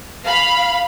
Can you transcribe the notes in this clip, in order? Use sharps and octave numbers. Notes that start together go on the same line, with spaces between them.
F5 B5